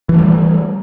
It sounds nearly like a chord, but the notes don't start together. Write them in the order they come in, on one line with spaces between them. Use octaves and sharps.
E3 A3 G3